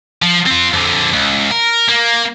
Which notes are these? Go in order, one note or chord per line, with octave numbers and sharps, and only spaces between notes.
F3
C4 F4
F2 D3
C#2
A#4
A#3